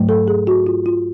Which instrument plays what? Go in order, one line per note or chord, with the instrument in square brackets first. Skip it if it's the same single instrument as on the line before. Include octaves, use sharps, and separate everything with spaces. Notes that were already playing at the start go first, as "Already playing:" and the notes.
Already playing: [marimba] G#2 F#3 A3
A4
G#4
F#4
F4
F4